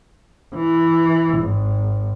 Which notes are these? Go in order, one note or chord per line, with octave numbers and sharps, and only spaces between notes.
E3
G#1